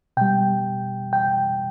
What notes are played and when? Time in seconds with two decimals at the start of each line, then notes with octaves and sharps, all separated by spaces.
0.17 B2 G3 G5
1.13 G5